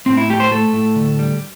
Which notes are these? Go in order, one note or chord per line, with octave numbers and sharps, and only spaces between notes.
A2 C4
E4
A3 G4
C5
A3 A4
A2
D3
G3